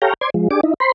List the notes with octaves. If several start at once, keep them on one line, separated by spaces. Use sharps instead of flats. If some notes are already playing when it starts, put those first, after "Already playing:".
G4 A4 C#5 F5 G5 A#5
C5 D5 C6 G#6
F3 G#3
D4 G4 G#4 D6
D#4 E4
C5 B5 C6